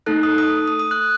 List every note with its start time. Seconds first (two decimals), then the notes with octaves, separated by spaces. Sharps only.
0.06 A3 D#4 A4 F#6
0.23 D#6
0.38 D#6
0.56 D#6
0.68 D#6
0.79 D#6
0.91 F#6